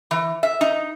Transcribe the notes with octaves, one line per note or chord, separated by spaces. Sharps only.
E3
E5
D#4